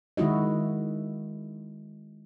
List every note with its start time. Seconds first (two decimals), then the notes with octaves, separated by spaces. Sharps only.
0.17 D#3 G#3 E4 F#4 D#5